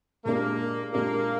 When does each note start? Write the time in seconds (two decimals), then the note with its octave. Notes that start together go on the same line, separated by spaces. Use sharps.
0.25 A#2 G#3 A#3 D4 G4
0.92 A#2 G#3 A#3 D4 G4